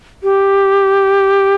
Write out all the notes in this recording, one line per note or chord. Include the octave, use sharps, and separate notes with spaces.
G4